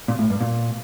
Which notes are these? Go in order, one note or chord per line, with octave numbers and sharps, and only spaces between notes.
A#2
A2
G2
A#2